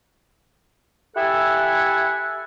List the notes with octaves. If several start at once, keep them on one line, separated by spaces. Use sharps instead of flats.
E4 G4 A4 E5 F#5 G#5